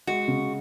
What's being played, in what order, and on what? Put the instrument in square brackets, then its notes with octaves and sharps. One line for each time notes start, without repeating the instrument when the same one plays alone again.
[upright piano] G#3 [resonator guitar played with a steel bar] F#4
[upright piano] C#3